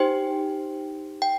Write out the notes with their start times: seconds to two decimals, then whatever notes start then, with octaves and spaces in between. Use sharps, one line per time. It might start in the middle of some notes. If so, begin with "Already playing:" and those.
Already playing: D#4 G4 C5 G5
1.22 G5